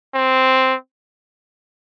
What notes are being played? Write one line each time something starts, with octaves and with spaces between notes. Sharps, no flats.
C4